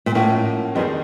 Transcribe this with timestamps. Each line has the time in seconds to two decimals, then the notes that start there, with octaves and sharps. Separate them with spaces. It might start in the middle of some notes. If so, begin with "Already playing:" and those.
0.06 A#2
0.15 A2 F3 A#3 C#4 F#4
0.75 F2 D#3 G3 B3 D#4 G#4